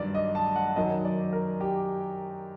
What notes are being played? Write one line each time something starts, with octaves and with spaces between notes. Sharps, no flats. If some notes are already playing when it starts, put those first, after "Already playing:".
Already playing: G2 D#3 F#3 D5
D#5
A5
F#5
F#2 D#3 F#3 D#5
D5
A#4
G4